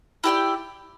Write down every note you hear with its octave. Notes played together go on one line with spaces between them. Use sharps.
E4 G4 D5 G5